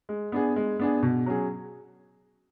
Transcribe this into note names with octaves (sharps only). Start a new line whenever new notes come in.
G#3
B3 D4 G#4
G#3
B3 D4 G#4
B2
F#3 C#4 G#4